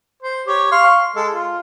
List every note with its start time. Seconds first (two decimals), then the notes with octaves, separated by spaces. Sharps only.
0.22 C5
0.47 G4 C#5
0.72 F5 C6 C#6
1.16 G#3 A4
1.32 F4